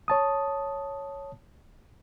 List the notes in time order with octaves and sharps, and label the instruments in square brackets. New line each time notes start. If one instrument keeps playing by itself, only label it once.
[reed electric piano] C#5 A5 D#6